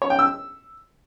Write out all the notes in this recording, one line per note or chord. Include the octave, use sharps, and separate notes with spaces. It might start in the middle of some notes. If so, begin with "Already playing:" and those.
C#5
G5
E6